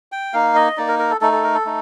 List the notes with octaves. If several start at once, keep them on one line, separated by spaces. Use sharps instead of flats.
G5
A#3 D#4 F5
D#5
A#3 D#4 D5
A#4
A#4
A4
A3 D#4 A4
A4
A#4
A4
A3 D#4